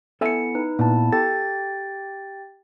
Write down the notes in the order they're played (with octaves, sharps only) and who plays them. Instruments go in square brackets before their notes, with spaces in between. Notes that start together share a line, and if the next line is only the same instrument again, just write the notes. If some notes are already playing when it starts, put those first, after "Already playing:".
[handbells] B3 E4 C#7 [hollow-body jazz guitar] A4 E5 G#5
[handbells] D#4 B4
[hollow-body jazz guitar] A#2 [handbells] B3 E4 A5
[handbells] G4 G5 A6 [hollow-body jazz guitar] A4